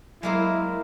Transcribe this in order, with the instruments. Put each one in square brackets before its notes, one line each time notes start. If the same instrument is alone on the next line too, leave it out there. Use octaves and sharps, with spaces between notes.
[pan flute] F#3 [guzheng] G#3 A#3 C5 [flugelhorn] E4